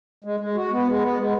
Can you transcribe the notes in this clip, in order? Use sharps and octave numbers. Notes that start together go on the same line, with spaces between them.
G#3
G#3
F#4
B3
G#3
B3
G#3